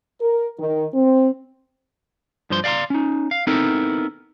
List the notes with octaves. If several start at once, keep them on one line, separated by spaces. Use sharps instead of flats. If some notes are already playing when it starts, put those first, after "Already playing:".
A#4
D#3
C4
G2 F3 C5 C6
D5 F5 F#5 A#5 C6
C#4 D#4
F5
B3 C4 D#4 E4 A4 A#4